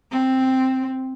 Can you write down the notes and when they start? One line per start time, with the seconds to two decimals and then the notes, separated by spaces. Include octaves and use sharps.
0.11 C4